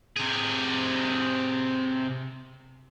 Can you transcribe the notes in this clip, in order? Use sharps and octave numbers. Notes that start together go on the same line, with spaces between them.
C3 G#4